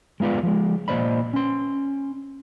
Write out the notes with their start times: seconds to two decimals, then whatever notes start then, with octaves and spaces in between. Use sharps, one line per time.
0.20 G#3 B3 F4 B4 D5
0.43 F3 G#3
0.88 A#2 C4 C5 D5 D#5 B5
1.34 C#4 C6